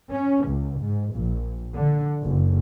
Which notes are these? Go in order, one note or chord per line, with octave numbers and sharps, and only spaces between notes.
C#4
C#2
G#2
A#1
D3
F#1